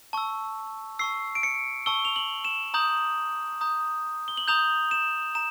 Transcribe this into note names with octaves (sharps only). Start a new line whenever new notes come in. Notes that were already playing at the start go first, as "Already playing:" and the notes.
A5 C#6 E6
A5 C#6 E6 C7
D7
C#7
A5 C#6 E6 G7
F7
F#7
E7
A#5 D#6 G6 F#7
A#5 D#6 G6
G7
F#7
A#5 D#6 G6 F7
E7
A#5 E7